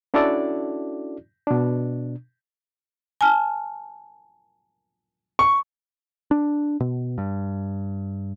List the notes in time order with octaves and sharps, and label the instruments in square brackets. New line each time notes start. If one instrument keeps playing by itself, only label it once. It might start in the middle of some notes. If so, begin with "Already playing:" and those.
[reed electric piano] C#4 D4 E4 F#4 A4 D5
B2 D4
[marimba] G#5 A5 F6
[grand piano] C#6
[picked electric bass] D4
B2
G2